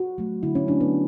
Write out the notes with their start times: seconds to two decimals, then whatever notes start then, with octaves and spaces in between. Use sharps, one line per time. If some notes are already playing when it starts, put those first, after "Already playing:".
Already playing: F#4
0.18 F#3 A3
0.43 D3 E4
0.55 C#4
0.67 F#3 A3 D4
0.81 B3